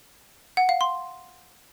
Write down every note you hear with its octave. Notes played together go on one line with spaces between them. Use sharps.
F#5
F5
C6